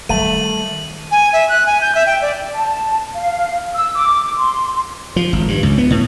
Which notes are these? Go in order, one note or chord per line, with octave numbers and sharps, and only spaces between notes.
D#3 G3 A3 D#7 F#7
G#5
E5
F#6
G#5
G6
E5
G5
D5
A5
F5
E6
D6
C6
F3
G#1
G2
C#2
B3
A2